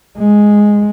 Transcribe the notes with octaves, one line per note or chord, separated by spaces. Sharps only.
G#3